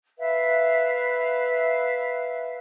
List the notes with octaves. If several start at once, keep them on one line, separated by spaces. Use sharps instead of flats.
B4 E5 F5